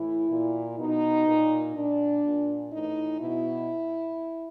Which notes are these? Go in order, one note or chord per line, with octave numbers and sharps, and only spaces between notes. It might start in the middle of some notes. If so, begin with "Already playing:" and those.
Already playing: A2 E3 E4
A#2
B2 D#4
A#2
A#2 D4
A#2
A2 E3 D#4
B2 E4